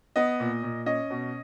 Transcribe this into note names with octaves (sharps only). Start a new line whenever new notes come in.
B3 D#5
A#2
A#2
C#4 D#5
B2